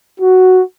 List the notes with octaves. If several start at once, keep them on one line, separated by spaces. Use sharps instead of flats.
F#4